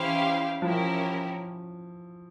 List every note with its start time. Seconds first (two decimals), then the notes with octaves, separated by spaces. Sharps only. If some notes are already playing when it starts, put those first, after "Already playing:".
Already playing: E3 C#4 E4 G4 C5 F5
0.62 F3 C#4 E4 G4 A#4